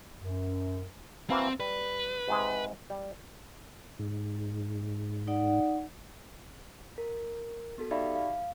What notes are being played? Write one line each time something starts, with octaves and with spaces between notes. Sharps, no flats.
F#2
E3 A#3 C4 F#4
G3 B4
G#2 C3 G#3
G3
G#2
D#4 D5 F#5
A#4
B3 F#4 A4
D#4 G4 D5 E5 F5 B5
F5